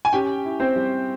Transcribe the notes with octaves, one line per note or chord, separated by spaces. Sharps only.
G#5
C#4 G4 G5
E4
C4 C5
G3